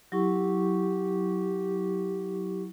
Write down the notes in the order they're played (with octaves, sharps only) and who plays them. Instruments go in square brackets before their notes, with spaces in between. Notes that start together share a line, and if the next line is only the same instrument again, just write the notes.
[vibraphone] F#3 E4 C#6 [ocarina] G4